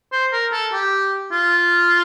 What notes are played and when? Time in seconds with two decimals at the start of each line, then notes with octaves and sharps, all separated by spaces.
0.12 C5
0.33 A#4
0.52 A4
0.73 G4
1.32 F4